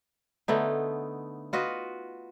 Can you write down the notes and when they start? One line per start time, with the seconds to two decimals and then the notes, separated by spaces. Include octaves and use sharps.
0.48 D3 A3 B3 D#4
1.53 F4 F#4 B4 D#5